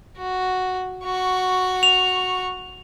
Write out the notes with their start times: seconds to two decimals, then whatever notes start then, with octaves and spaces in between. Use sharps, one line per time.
0.17 F#4
1.05 F#4 C#6
1.83 F7